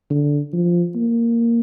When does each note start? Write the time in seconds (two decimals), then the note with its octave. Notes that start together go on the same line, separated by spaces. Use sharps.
0.10 D3
0.53 F3
0.95 A#3